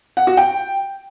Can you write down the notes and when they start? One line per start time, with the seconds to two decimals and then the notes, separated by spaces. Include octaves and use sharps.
0.17 F#5
0.27 F#4
0.37 G5